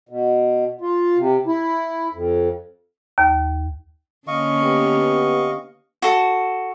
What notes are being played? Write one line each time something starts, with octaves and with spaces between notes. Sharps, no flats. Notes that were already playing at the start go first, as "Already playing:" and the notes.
B2
F4
C3
E4
F2
D#2
D3 A#3 C#4 D#5 F5 C#6
B3 G4
F#4 A4